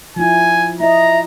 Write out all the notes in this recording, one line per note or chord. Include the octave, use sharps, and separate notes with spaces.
F3 E4 G#5
E4 D#5 E5 A#5